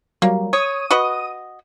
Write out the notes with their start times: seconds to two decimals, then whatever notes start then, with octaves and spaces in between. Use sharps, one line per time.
0.22 F#3 G3 A#3
0.53 C#5 D#6 D#7
0.91 F#4 B4 D#5